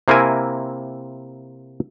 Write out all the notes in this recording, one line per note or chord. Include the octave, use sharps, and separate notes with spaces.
C3 A#3 C4 E4 A#4 G#5